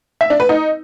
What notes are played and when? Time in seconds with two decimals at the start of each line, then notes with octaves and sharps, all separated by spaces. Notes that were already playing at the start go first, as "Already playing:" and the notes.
0.21 E5
0.30 D4
0.40 B4
0.49 D#4